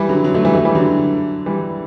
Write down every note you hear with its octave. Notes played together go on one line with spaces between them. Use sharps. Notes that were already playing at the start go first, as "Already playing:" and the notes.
Already playing: E3 G3
D3 F#3
D3 F#3
F#3 A3
E3 G3
F#3 A3
E3 G3
D3 F#3
E3 G3